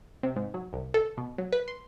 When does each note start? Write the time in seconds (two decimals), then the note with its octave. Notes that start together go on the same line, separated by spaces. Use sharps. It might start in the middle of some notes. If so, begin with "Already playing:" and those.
0.23 C3
0.36 G#2
0.54 F#3
0.73 C2
0.94 A4
1.17 B2
1.38 F#3
1.52 B4
1.68 C6